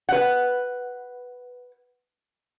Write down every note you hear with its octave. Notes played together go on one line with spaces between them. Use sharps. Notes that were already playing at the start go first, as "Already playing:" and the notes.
B4 F#5